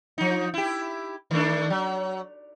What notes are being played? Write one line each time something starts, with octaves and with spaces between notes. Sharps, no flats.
F3 D#4
E4 G4
D#3 A3 D4
F#3